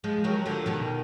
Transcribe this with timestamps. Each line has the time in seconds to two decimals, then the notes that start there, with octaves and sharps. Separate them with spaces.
0.04 F3 G#3
0.24 D#3 F#3
0.46 D3 F3
0.66 B2 D#3